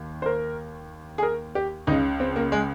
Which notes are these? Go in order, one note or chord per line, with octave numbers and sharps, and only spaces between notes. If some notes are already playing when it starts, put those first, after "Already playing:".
Already playing: D#2 D#3
C5
A#4
G#4
A#4
G4
C#2 C#3 D#4
C4
A#3
G#3